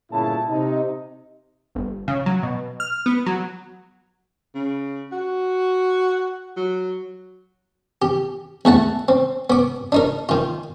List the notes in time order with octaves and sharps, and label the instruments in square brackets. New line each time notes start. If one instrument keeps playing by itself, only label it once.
[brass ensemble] G1 A#2 C#3 E4 A5
C3 D#4
[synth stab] G1
C#3
F#3
B2
F6
B3
F#3
[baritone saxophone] C#3
F#4
F#3
[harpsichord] G4
E2 A3 F#5 A5
C4
B3 D6
D4 D#4 A#4
D#3 F4